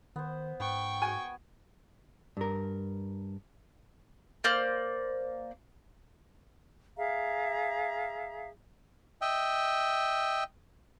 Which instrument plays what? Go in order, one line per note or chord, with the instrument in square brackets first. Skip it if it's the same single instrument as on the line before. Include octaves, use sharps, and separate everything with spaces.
[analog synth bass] D#3 [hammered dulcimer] B3 C5
[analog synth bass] G#2 [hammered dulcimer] B3 [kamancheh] G5 C#6
[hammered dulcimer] F#4 [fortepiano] G#5
[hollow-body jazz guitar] G2 A#4
[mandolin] A#3 C5 D5 F6
[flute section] G#4 E5 F5 A#5
[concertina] D#5 E5 G5